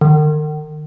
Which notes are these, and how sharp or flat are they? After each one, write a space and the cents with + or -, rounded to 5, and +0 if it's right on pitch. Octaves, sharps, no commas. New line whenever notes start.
D#3 -40